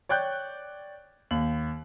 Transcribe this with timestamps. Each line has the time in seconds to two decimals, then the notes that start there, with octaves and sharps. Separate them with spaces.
0.09 C#5 D5 G5 F#6 G6
1.31 D#2 F#7